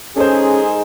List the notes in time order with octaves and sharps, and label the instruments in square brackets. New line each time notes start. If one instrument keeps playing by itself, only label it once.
[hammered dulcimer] D#3 G#3 [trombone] C#4 [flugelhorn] G#4 [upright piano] A4 C5